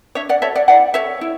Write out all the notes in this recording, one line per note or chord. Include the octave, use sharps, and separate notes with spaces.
D4 C#5 E5
D5 F#5
F#4 A4 C#5 E5
D5 F#5
E4 D5 F#5
A4 C#5 E5
E4